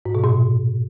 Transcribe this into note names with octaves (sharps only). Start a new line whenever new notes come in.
G#2
B2
A#2